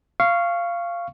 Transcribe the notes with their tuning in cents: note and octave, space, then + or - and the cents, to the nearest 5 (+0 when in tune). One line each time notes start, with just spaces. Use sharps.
F5 -15 C#6 +0